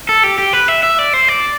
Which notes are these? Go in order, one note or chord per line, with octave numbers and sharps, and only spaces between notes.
A4
G4
G4
B4
E5
E5
D5
C5
D5